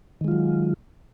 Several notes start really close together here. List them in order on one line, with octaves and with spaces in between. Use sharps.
D#3 G#3 F4 F#3